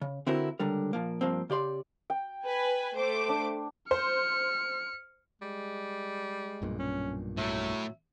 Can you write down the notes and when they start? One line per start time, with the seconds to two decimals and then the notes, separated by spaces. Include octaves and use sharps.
0.02 C#3
0.27 D3 C4 E4 F#4 A#4
0.60 C#2 D3 G3 A#4
0.93 A#2 F3 A#3
1.21 G2 F3 A#3 C4
1.50 C#3 G4 D5 C6
2.10 G5
2.47 B4 G#5
2.97 A3 C5 D6
3.29 D4
3.91 C5 F6 C#7
5.42 G3 G#3
6.62 B1 G2 A#2
6.79 C#4
7.38 A2 F#3 E5